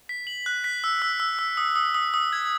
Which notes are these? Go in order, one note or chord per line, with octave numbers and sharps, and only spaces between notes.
B6
F#7
F#6
B6
E6
E6
E6
E6
D#6
D#6
D#6
D#6
G#6